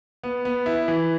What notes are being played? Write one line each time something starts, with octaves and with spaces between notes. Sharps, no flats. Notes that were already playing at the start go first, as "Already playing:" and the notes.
B3
B3
E4
E3